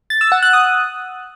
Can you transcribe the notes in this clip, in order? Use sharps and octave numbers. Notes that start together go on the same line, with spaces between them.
A6
E6
F#5
F#6
D#6